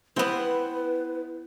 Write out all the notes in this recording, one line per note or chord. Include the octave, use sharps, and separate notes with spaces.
B3 C4 E4 B4 C5 F#5